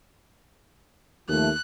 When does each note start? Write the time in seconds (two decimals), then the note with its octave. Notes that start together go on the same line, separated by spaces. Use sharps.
1.29 D#2 D#3 F3 A3 F#6